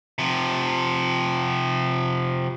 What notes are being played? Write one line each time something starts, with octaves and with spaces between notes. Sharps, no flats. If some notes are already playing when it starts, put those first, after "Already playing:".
C3 F3